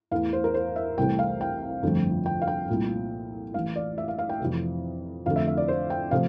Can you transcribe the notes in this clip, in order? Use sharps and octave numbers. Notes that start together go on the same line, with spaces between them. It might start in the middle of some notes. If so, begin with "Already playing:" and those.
E2 E3 A3 F5
C5
A#4
C5
E5
C2 C3 E3 A3 G5
F5
G5
G1 F2 D3 F3 A3
G5
F5
G5
C2 A#2 A3
A1 A2 E3 F5
D5
E5
F5
F5
G5
F2 C3 E3 A3
F2 D3 A3 F5
E5
E5
D5
C5
G5
C3 F3 A3 F5